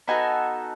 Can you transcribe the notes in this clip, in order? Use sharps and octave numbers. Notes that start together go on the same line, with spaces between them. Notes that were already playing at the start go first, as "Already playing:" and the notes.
B3 D#4 F#4 A4 G#5